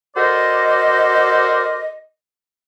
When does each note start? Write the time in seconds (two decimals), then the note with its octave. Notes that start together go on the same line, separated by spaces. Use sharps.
0.16 F#4 A4 A#4 C5 D5 D#5